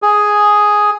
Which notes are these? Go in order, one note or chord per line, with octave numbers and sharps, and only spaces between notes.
G#4